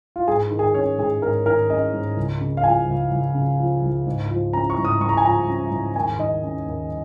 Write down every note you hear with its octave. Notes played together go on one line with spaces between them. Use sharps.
F4
G#2 G#4
D#3
G#4
C#4 C#5
G#2 G#4
G#2 A#4
D#3 A#4
C#4 D#5
G#2
C#2
C#3
F5
F3 G#5
C#2
C#2
C#3
F3
C#2
G#2
F3
C#4 A#5
C#6
G#2
D#6
G#2 C#6
A#5
G#5
F3 A#5
C#4
G#2
D#2 G#5
D#3 D#5
C#4
D#2